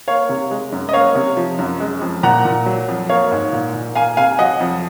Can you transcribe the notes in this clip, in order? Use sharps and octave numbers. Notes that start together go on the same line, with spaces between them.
A#3 C#5 F5
C3
G#3
F#2
D#5
A#3 C#5 F5
C3
F3
F#2
G#3
F2
A#2 F#5 A#5
A#2
F#3
F2
A#3 C#5 F5
G#2
A#2
A#2
A#3 F5 G#5
C3 F5 G#5
F#3 D#5 F#5
F2